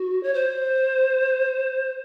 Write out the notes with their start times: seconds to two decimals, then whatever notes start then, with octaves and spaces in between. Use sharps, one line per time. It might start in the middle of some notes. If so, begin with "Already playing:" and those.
Already playing: F#4
0.23 C#5
0.33 C5